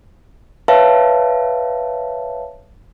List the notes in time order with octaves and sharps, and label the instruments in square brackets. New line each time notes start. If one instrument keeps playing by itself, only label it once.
[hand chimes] B4 C#5 E5 F5 A5